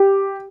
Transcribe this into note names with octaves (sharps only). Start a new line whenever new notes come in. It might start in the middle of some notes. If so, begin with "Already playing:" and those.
Already playing: G4